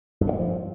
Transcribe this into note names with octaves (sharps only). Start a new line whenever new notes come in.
G2
D3
G#3
F3